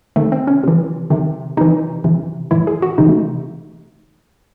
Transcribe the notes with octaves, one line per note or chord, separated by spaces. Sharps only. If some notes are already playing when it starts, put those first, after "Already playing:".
C3 D#3 A3
C4
C#4
C3 E3
C3 D#3
C3 E3 D#4
C3 E3
A2 E3 E4
G#4
F#4
C3 E3 D#4
A3